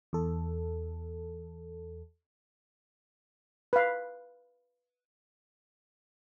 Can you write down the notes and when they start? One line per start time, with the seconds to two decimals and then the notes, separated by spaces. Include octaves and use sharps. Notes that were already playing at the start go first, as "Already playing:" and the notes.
0.13 E2 A4
3.73 B4 F5